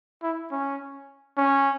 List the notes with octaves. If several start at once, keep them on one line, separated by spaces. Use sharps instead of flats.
E4
C#4
C#4